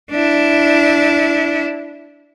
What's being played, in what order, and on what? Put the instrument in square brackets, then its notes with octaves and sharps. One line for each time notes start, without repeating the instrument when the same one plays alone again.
[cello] D4 E4